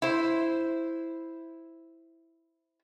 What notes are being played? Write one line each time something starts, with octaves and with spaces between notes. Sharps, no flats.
E4 C5